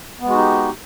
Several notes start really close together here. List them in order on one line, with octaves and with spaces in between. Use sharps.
B3 G#3 F#4 D#4 G4